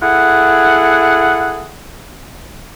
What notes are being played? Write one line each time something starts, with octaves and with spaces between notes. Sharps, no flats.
E4 G#4 A4 F#5